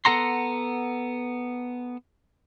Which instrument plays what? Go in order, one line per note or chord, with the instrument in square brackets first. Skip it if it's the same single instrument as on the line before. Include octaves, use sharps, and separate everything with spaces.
[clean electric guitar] B3 A4 F#5 A#5 C6